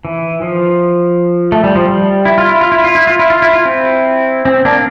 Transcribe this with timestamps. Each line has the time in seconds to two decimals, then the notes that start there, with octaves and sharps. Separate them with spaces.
0.05 E3
0.42 F3
1.52 A3
1.64 G3
1.75 F3
1.87 G3
2.25 E4
2.38 F4
2.49 E4
2.61 F4
2.72 E4
2.84 F4
2.95 E4
3.07 F4
3.19 E4
3.30 F4
3.42 E4
3.53 F4
3.65 C4 E4
4.45 C4
4.65 A#3 D4